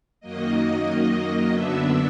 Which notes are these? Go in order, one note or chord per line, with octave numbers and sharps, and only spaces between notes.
F#2 D#3 F#3 A#3 D#5
F#2 D3 F#3 B3 D4 E5